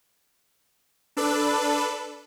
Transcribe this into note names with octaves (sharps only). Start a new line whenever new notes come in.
D4 A4 B4